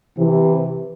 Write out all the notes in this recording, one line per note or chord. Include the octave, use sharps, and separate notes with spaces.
C3 E3